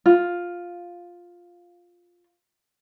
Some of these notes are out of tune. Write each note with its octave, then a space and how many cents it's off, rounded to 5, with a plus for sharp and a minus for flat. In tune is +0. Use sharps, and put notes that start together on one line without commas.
F4 +5